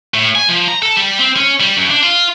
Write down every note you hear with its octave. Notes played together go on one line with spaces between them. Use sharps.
A2
G#5
F3
A#5
A4
G3
C4
C#4
G3
F#2
D4
F4